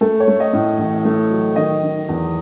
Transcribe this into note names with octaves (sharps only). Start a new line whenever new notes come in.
A3 A4
C#5
A3
D#5
A2
A1
A3
F#3
D#3 D#5
D#3
E2